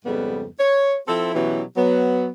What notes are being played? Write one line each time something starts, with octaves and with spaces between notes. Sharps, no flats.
F2 G#2 C#3 G3 B3
C#5
F3 C4 E4 A4
B2 E3 F#3 C#4 E4 G4
F#3 B3